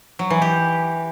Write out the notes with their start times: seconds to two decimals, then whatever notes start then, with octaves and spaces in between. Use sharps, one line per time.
0.19 F#3
0.30 E3
0.42 G4